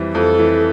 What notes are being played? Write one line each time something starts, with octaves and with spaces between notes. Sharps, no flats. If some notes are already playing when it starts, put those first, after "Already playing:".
Already playing: F2 E3 G3
F2 A4
E3